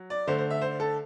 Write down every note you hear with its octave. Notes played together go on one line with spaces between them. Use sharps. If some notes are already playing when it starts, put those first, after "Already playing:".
Already playing: F#3
D5
D3 A3 C5
C5
E5
C5
A4